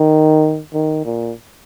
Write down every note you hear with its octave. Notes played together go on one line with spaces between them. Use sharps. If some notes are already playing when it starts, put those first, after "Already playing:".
Already playing: D#3
D#3
A#2